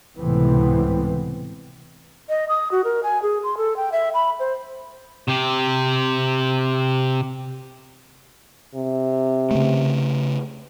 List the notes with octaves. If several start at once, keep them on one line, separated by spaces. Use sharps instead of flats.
C#2 A2 C3 E3 B3 C4
D#5
D#6
F#4
A#4
G#5
G#4
C6
A4
G5
E5
B5
C5
C3 G4
C3
C#3 A3